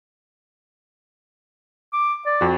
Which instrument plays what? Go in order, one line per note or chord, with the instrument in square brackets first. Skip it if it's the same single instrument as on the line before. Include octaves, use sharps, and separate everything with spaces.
[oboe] D6
D5
[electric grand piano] F2 F#4